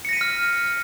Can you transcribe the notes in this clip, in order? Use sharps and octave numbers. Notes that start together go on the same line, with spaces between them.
F6 A#6 B6 C#7 D#7